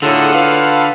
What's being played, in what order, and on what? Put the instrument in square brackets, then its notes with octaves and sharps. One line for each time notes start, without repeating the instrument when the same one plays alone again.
[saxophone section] A2 F#3 G#4 [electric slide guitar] D3 [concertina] F4 A4 F#5
[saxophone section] B4 F5